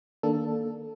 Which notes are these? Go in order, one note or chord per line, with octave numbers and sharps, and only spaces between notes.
D#3 A#3 D4 A4